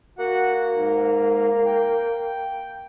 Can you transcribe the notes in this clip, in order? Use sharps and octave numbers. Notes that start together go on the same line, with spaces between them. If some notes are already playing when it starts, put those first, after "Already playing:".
A#3 F#4 F#5
G#2
G5